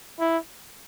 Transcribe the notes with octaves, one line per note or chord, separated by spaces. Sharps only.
E4